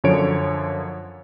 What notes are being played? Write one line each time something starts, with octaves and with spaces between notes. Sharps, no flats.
F#2 D3 F3 C#5 D7